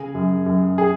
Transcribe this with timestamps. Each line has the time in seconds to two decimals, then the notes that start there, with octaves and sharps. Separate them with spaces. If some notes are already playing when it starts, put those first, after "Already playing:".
Already playing: C#3 G#4
0.15 F#2
0.46 F#2
0.78 G#4